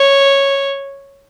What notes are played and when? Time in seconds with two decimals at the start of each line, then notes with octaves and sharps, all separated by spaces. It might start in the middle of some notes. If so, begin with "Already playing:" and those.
Already playing: C#5